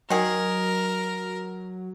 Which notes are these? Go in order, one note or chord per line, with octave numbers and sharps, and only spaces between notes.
D#3 F#3 G#4 A#4